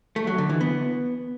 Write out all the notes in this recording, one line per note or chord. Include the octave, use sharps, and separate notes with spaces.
A3
F#3
D3
E3
B3